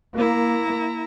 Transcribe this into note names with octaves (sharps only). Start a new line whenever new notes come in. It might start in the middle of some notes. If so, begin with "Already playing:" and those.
A#3 E4 A#5